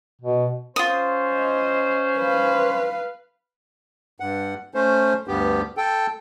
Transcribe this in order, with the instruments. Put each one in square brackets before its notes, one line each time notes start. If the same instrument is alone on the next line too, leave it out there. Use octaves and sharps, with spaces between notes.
[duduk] B2
[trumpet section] C#4 C5 [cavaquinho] F4 D#6
[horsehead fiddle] D#5
B4 F5
[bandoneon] G2 F#5
A3 C#4 C5
D2 G2 B3 G4
A4 G5